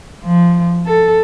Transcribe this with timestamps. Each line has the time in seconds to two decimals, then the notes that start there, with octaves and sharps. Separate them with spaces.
0.25 F3
0.86 A4